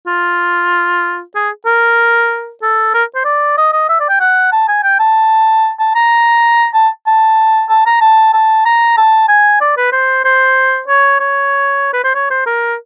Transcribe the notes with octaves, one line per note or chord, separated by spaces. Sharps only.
F4
G#4
A#4
A4
A#4
C5
D5
D#5
D#5
E5
D5
G5
F#5
A5
G#5
G5
A5
A5
A#5
A5
A5
A5
A#5
A5
A5
A#5
A5
G#5
D5
B4
C5
C5
C#5
C#5
B4
C5
C#5
C5
A#4